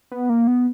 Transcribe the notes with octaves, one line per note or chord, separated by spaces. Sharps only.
B3
A#3
B3